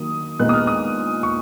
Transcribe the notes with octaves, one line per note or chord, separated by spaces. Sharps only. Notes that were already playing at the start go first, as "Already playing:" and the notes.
Already playing: D#3 F#3 A#3 D#6
A#2 G#3 B3 D#4 F#6
D#6
F6
D#6
C#6